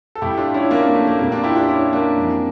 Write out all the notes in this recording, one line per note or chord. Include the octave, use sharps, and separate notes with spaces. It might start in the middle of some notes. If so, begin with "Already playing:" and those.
A4
A2 G3 E4 G4
D4 F4
C#4 E4
A#3 D4
A#3
A3
A#3
A#2 G3 A#3
D4 F4
E4 G4
D4 F4
C#4 E4
A#3 D4
F2 E3 G3